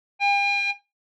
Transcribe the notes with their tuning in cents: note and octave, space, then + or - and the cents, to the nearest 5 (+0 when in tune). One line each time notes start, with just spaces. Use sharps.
G5 +45